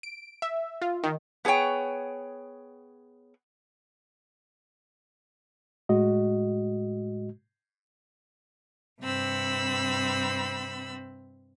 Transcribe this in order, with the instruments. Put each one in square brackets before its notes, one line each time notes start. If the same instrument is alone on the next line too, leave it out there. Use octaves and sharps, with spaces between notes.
[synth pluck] D7
E5
F4
D#3
[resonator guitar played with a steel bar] B3 G#4 A4 C#5 G5
[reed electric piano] A2 G#3 F#4 D#5
[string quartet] G2 C3 C4 B5 E6